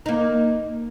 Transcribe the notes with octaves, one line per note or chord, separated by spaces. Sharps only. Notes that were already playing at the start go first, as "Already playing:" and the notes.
A#3 D#4